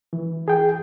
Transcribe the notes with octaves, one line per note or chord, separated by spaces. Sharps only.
E3
G#4 G5